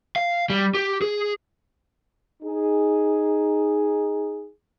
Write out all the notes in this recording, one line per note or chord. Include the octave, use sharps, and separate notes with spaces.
F5
G3
G4
G#4
D#4 G#4